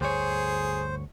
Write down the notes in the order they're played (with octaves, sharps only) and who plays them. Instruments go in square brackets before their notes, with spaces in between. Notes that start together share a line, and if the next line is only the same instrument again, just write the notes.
[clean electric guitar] D2 G2 C#5 [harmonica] G#4 [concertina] C5